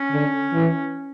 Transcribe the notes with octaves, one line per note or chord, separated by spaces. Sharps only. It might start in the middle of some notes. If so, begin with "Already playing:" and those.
Already playing: C#4
D3
E3